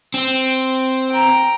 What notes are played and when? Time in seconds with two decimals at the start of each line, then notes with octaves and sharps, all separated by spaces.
0.14 C4
1.10 G5 A#5